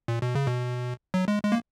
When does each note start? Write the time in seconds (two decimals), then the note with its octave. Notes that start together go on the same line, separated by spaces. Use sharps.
0.08 A#2
0.22 B2
0.35 C#3
0.47 B2
1.14 F#3
1.28 G#3
1.44 G#3
1.52 A#3